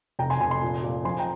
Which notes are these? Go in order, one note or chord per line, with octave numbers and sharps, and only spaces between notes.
F1 G5 A#5
G#5 C6
F1 G#5 C6
G#5 C6
A#2
A#2
F3 G#5 C6
G5 A#5